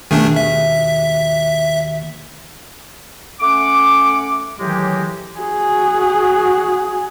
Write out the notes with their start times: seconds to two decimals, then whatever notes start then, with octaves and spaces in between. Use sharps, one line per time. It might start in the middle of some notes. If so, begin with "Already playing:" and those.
0.11 D#2 B2 D#3 A3 D4 G#4
0.36 E5
3.40 A3 C#4 F#5 D6
4.59 A2 D#3 E3 F#3 G#3 G4
5.40 F#4 G#4